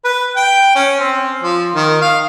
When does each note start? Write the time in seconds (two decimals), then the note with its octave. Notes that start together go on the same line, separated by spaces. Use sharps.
0.05 B4
0.36 G5
0.75 C#4
1.00 C4
1.43 F3
1.75 D#3
2.01 F5